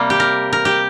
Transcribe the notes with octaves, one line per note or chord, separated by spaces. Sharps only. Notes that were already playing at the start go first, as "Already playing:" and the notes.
Already playing: C3 G3 A#3
G4
A#4
A#4
G4